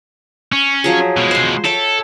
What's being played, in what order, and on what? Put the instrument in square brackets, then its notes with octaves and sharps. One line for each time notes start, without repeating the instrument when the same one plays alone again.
[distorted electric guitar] C#4
[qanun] F3 F#3 G#4
[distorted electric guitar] B2 G#3
[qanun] C5 C6
[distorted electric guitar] A4 [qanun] C#5 E5 G5